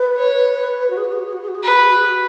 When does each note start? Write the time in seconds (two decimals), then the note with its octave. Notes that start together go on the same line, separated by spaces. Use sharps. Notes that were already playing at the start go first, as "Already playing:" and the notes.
Already playing: B4
0.17 C#5
0.90 F#4
0.97 G#4
1.04 F#4
1.12 G#4
1.19 F#4
1.26 G#4
1.33 F#4
1.41 G#4
1.48 F#4
1.55 G#4
1.63 F#4 B4
1.69 G#4
1.77 F#4
1.85 G#4
1.91 F#4
1.99 G#4
2.05 F#4